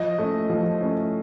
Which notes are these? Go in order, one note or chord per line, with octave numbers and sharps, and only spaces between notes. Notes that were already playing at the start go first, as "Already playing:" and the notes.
Already playing: F3 D#5
A3 C#4
F3
A3 C#4